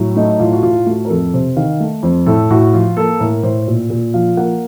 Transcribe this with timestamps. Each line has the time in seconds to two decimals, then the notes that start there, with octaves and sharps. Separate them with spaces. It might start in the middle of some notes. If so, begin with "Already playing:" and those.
Already playing: A2 F#3
0.16 A3 D#4
0.40 A2 F4
0.53 F#4
0.63 A2 F4
0.86 A3 F#4
1.05 A#4
1.10 F2 A4
1.34 C3 C5
1.57 D#3 F5
1.80 A3
2.03 F2 C5
2.26 A2 A4
2.50 A2 F#4
2.74 F3 F4
2.97 A#3 A4
3.20 A2 A#4
3.43 A2 C5
3.68 A#2
3.90 A#2
4.14 F3 F5
4.37 A#3 F#5